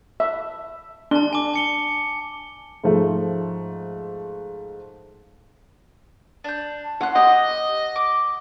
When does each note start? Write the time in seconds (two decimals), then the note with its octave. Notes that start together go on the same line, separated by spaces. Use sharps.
0.20 E5
1.11 D4 A5 G7
1.33 G#5 D6
1.54 G#5 C#7 G7
2.84 G#2 F3 A3
6.44 D4 G6
7.01 C#4 F#5 C6 F#6
7.15 G4 D#5 D#6
7.96 D6